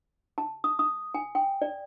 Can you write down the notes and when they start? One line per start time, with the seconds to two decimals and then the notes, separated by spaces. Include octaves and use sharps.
0.38 A5
0.64 D#6
0.79 D#6
1.14 G#5
1.35 G5
1.62 D5